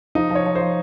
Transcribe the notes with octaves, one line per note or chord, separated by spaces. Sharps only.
F3 D#4
F3 C#5
F3
C5
F3